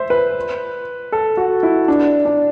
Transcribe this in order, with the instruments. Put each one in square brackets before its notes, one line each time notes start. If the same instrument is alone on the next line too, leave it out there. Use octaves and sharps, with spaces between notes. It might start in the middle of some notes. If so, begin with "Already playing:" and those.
Already playing: [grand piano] C5 E5
B4
A4
F#4
E4
D4
D4